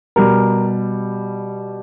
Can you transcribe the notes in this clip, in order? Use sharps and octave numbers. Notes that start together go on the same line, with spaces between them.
B2 G3 A#4